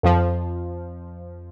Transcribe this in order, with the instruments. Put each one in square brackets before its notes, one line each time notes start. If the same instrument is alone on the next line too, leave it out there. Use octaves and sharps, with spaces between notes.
[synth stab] F2 F3